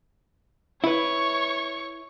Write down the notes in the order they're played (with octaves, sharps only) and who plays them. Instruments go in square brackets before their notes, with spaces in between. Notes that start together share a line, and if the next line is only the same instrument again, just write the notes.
[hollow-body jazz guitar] E4 B4 [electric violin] C#5 C#6